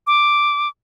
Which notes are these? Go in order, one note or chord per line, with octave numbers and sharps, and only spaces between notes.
D6